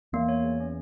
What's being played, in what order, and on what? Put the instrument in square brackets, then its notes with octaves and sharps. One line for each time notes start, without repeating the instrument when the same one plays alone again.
[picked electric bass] E2 [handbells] A#3
[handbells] C#5
G#4
C#4